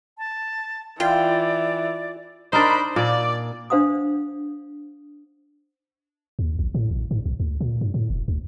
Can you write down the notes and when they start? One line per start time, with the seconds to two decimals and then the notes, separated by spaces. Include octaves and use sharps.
0.18 A5
1.00 E3 F4 D5 G5
2.53 D4 D#4 A#4 C5 B5
2.96 A#2 D5
3.70 D4 C5 F5 F#5 D#6
6.39 D#2
6.59 A#1
6.74 A2
6.91 A#1
7.11 G#2
7.26 B1
7.40 D2
7.61 A#2
7.81 G2
7.94 A2
8.10 E1
8.28 D2